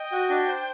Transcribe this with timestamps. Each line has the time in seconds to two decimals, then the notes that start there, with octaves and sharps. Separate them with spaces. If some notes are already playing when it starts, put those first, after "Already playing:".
Already playing: D#5 G5
0.12 F#4
0.30 D4
0.48 C5